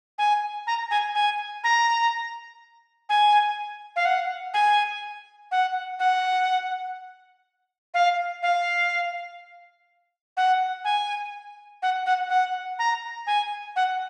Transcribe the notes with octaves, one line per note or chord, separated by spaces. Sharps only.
G#5
A#5
G#5
G#5
A#5
G#5
F5
F#5
G#5
F#5
F#5
F5
F5
F#5
G#5
F#5
F#5
F#5
A#5
G#5
F#5